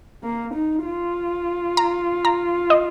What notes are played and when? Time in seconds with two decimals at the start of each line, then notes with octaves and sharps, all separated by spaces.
0.24 A#3
0.54 D#4
0.85 F4
1.77 A#5
2.25 A#5
2.70 D#5